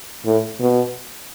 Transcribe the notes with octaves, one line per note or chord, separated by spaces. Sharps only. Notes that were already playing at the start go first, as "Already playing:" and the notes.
A2
B2